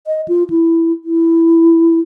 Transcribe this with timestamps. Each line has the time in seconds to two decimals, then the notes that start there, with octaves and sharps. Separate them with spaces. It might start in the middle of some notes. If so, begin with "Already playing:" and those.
0.07 D#5
0.28 F4
0.50 E4
1.04 E4